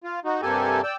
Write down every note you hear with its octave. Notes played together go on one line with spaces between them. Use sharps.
F4
D#4 F#4
G2 C3 A#3 G4 A4 G#5
D5 G5 E6